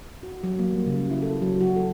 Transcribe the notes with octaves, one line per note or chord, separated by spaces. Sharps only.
F#4
F#3
A#3
G3
C#3
G3
E4
A4
F#3
F#4
A4